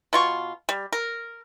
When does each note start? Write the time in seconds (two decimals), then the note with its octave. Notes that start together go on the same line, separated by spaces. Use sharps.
0.13 B2 F4 C#6
0.69 G3
0.93 A#4